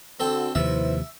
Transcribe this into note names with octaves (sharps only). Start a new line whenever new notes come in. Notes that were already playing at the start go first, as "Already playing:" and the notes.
D3 C4 F#4 A4 G5
D#2 C3 F3 E4 B4 C5 E5